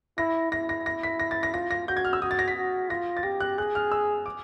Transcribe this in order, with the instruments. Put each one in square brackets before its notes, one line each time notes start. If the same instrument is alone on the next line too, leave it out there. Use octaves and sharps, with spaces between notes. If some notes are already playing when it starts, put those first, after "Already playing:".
[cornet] E4 [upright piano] A#6
[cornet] E4 [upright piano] A#6
[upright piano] A#6
A#6
B6
A#6
A6
A#6
[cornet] F4 [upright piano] A#6
[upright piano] A#6
[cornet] F#4 [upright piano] G6
[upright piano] G#6
F6
E6
[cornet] F#4 [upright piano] D#6
[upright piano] A6
A#6
B6
[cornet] F#4
[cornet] F4 [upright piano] A#6
[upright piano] A6
[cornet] G4 [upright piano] A#6
[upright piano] F#6
[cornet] G#4 [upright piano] F#6
[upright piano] F6
E6
D6